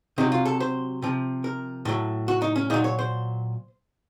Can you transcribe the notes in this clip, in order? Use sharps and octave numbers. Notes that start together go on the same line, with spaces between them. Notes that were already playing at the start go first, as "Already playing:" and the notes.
C3 F#3 D#4
F4
A4
C5
C3 F3
A#4
A2 F#3
F#4
D#4
C#4
A#2 F#3 D#4
C#5
C5